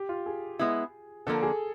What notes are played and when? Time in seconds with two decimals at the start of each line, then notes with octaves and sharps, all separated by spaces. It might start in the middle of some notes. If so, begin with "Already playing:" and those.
Already playing: G4
0.09 F4
0.26 G#4
0.59 G#3 B3 E4
1.27 D3 F3 A#3 D4 A4
1.42 G#4